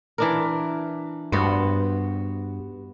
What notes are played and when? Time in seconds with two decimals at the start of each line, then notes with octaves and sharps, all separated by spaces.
0.18 E3 D4 A#4
1.32 G2 B3 F#4 C5